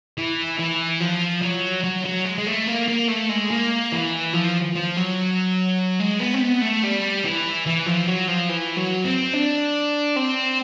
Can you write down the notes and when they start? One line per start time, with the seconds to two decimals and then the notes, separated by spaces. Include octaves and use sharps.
0.18 E3
0.59 E3
1.01 F3
1.42 F#3
1.84 F#3
2.05 F#3
2.25 G#3
2.38 G#3
2.47 A3
2.68 A#3
2.89 A#3
3.09 A3
3.29 G#3
3.51 A#3
3.92 E3
4.33 F3
4.76 F3
4.96 F#3
6.00 G#3
6.20 B3
6.34 C4
6.41 B3
6.62 A3
6.84 G3
7.24 E3
7.66 E3
7.86 F3
8.08 F#3
8.28 F3
8.49 E3
8.77 F#3
9.05 C4
9.33 D4
10.16 C4